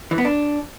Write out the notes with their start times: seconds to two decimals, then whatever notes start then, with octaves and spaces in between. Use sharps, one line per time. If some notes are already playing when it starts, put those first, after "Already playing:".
0.11 E3
0.18 B3
0.25 D4